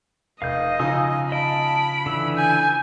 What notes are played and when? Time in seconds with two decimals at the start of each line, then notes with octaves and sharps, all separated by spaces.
0.42 F1 D#5 F5 G6
0.79 C#3 F3 D#4 G#5 D#6 E6
1.32 D#5 A5 B5 D7
2.06 D3 E3 E6
2.37 G#5 G6